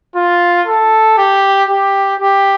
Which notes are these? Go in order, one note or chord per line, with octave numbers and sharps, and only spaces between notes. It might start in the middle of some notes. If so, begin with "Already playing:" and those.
F4
A4
G4
G4
G4